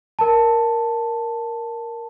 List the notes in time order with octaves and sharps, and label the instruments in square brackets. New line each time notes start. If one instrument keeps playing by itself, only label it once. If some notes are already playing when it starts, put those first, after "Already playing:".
[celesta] A#4 A5